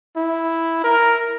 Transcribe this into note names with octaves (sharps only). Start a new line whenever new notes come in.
E4
A#4